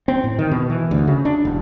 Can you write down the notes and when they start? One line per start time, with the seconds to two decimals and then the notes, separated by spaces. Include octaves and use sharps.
0.08 C4
0.24 A2
0.39 D#3
0.51 B2
0.70 E3
0.91 D2
1.07 C#3
1.25 D4
1.45 E1